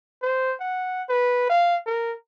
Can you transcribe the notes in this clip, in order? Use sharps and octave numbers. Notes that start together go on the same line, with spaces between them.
C5
F#5
B4
F5
A#4